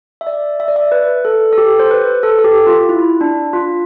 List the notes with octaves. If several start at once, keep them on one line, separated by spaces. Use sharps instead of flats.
E5
D5
E5
D5
E5
B4
A4
A4
G4
C5
B4
A4
A4
G4
F4
E4
D4
F4